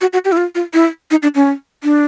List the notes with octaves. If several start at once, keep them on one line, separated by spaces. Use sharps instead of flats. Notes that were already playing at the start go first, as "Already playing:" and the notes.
F#4
F#4
G4
E4
F4
F4
E4
D#4
D4
C#4
D4